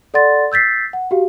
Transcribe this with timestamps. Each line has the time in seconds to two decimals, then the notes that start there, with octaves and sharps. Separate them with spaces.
0.14 A4 D5 F#5 C6 A6
0.52 E6 G6 A6 B6 C7
0.93 F#5
1.11 F#4 G4 F5